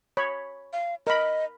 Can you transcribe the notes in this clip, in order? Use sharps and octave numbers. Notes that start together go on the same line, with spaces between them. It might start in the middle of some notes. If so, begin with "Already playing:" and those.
C#5 B5
F5
A#4 D#5 B5